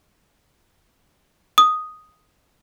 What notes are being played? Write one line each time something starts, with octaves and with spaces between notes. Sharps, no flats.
D#6